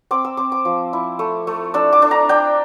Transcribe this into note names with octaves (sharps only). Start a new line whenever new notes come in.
C4 D6
E6
C4 D6
D6
F3
E4
A3
A3
D4 E6
D6
D4
A#5
D4 G5